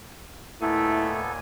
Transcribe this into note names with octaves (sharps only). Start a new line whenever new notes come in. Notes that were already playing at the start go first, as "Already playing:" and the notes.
D#2 A#2 A3 B3 E4 A4 G#5